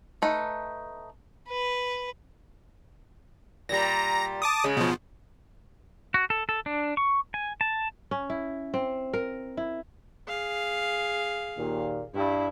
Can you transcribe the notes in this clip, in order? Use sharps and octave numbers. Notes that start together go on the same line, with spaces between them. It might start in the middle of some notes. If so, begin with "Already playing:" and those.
A3 D#4 B4
B4
A#2 G3 A#5 A#6
A5 D6 D#6
C#3 G#3
B2 F3
F#4
A4
A4
D4
C#6
G#5
A5
C#4
E4
C4
A#4
E4
G#4 F5
D#2 A#2
G2 E4